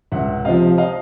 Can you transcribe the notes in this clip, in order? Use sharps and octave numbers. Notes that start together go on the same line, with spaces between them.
C#2 E5 F#5
C3 F3 D#5 F5
D#5 F5